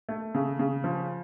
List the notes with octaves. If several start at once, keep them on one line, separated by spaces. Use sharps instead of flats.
A3
C#3
C#3
F3